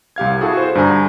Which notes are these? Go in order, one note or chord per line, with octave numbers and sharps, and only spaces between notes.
C2 G4 F5 G#6
E4 F#4 G#4 A4
F#4 C5
G2 D3 G#5 A#5